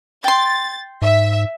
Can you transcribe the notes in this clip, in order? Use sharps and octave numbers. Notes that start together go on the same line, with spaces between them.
G5 C6 A6
G#2 E5